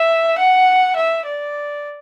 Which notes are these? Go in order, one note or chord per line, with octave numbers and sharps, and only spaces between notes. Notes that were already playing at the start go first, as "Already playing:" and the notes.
Already playing: E5
F#5
E5
D5